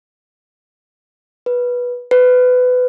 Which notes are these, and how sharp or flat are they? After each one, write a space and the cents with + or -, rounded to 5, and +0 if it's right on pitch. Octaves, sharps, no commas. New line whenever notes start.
B4 -15
B4 +20